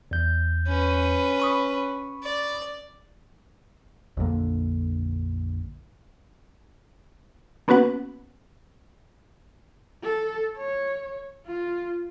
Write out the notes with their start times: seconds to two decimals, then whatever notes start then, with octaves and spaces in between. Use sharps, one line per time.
0.11 E2 G6
0.67 C#4 B4
1.40 B5 C#6 D#6
2.23 D5
4.17 A#1 F2 D3 A#3
7.68 A#3 B3 C#4 F#4 B4 F#5
10.03 A4
10.58 C#5
11.47 F4